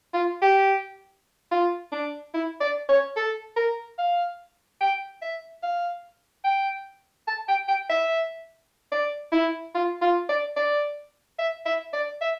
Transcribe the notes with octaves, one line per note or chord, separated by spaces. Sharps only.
F4
G4
F4
D4
E4
D5
C#5
A4
A#4
F5
G5
E5
F5
G5
A5
G5
G5
E5
D5
E4
F4
F4
D5
D5
E5
E5
D5
E5